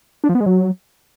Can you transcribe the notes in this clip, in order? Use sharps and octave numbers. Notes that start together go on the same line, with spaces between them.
D4
F3
B3
G#3
F#3